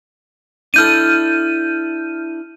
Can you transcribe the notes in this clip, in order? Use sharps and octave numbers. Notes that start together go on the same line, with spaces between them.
D4 E4 A4 F6 G6 D#7